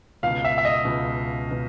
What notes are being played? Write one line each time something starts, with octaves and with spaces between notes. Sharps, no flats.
C#2 B2 F5
E5
E5
D#5
C#2 B2
B2